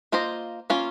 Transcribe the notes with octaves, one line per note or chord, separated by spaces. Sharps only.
A#3 F4 C5 D#5
A#3 C#4 F4